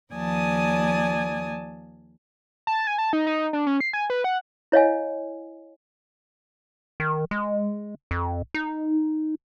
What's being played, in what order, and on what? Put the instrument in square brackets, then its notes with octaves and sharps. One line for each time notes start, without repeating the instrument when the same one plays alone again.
[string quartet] D#2 F3 D5 G#5 A5 D#6
[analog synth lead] A5
G#5
A5
D#4
D#4
D4
C#4
C7
G#5
B4
F#5
[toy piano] E4 C#5 D#5 F5 G#5
[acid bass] D#3
G#3
F2
D#4